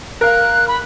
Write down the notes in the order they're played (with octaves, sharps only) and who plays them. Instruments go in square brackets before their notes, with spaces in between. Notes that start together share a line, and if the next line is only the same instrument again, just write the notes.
[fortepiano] A#4 F5 [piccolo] F#6
[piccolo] B5